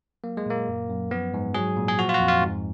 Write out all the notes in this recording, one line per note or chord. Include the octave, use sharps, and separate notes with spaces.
F#3 A#3
G#3
A#2 A#3
F#2
F#2
F3 B3
G#2
F#3 G#4
A#2
G#4
F3 F#4
F4
F#4
F2
F4
G#2